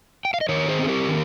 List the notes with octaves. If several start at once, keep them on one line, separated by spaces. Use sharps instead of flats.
G5
F5
D#5
D#3 A#4 C#5
G#4 C5
C4 G#4
G4 A#4
D#3